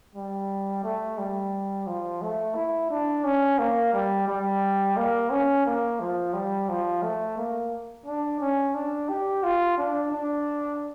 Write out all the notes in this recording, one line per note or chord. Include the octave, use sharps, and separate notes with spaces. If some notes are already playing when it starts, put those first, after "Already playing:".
G3
A3
G3
F3
A3
E4
D4
C#4
A#3
G3
G3
A#3
C#4
A#3
F3
G3
F3
A3
A#3
D4
C#4
D4
G4
F4
D4
D4